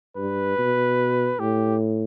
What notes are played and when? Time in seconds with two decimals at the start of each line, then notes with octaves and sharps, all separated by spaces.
0.17 G2 B4
0.58 B2
1.40 A2 G4